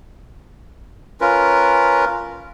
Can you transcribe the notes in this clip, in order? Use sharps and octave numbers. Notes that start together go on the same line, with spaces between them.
C#4 F4 A#4 B4